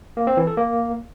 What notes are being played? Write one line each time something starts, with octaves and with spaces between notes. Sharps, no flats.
A#3
C4
E3
A4
A#3